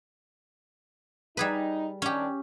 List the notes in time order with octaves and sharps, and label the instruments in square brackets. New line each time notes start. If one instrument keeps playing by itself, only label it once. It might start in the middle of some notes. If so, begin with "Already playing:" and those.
[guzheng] G3 G#4 B4 [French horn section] D#4
[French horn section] D#3 G3 D4 [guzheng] C#4 G4